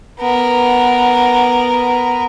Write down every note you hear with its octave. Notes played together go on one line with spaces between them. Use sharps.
B3 A#4